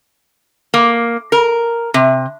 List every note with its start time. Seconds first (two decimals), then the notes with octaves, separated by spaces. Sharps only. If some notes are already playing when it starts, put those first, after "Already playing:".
0.74 A#3
1.32 A#4
1.94 C3